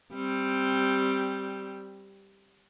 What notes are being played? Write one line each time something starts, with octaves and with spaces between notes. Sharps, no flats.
G3 C4